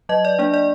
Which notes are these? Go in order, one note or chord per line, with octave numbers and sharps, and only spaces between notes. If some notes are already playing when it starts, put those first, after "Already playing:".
F#3 D#5
D5
A#3 D4 D5
D5